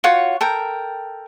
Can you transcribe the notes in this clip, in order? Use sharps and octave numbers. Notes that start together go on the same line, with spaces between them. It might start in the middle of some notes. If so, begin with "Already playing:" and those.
F4 F#4 C#5 F#5
A4 A#4 G5